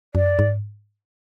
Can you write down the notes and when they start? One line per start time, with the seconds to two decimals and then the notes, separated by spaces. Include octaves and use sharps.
0.15 F#2 D5
0.39 G#2